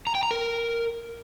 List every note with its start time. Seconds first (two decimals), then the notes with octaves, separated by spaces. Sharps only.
0.07 A#5
0.15 G5
0.23 A#5
0.31 A#4